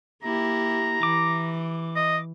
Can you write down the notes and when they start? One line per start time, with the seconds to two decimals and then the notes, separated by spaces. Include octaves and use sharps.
0.23 A#3 E4 G4 A#5
1.03 E3 D6
1.96 D#5